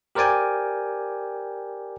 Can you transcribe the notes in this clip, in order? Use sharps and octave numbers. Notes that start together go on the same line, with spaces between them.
G4 A#4 C5 D5 G5 G#5